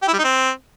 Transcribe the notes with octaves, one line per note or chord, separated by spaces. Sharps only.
G4
E4
G3
D#4
C4